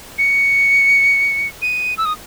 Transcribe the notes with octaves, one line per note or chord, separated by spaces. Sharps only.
C#7
D#7
E6
D#6